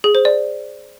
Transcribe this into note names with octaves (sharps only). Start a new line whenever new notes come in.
G#4
C5
D5